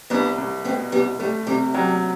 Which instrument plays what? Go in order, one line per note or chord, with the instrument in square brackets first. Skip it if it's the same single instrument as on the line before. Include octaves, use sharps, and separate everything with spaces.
[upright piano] C2 [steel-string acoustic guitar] B3 D4
[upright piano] C2
[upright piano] B2 [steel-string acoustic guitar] A3 C4
[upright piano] C2 [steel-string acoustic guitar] G3 B3
[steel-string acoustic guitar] G3 [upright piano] A3
[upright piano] C3 [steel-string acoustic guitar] G3
[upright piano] F#3 [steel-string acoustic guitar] G3